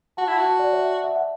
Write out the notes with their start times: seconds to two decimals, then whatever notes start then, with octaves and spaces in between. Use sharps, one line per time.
0.17 F#4 F#5 A5
0.28 E4 F#5 A5
0.38 F#4
0.45 F#5 A5
0.59 D5 F#5
0.72 C#5 E5
1.04 E5
1.16 F#5